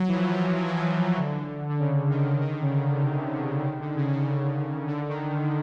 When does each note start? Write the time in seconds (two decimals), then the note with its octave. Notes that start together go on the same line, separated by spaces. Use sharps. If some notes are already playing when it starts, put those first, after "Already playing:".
Already playing: F#3
0.08 E3
0.14 F3
0.28 E3
0.35 F3
0.56 E3
0.66 F3
0.74 E3
1.18 D3
1.69 D3
1.79 C#3
2.09 D#3
2.41 D#3
2.50 D3
2.61 C#3
2.71 D3
3.03 C3
3.33 C#3
3.63 D#3
3.80 D3
3.95 C#3
4.11 C#3
4.87 D3
5.03 D3
5.09 D#3
5.29 D3
5.43 D3